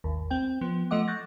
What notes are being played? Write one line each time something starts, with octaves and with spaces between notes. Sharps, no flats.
G#1 D#2
C4 G5
F3 B3
F3 A3 D#5 F#5 D6
C#6 F#6 G6 A6 A#6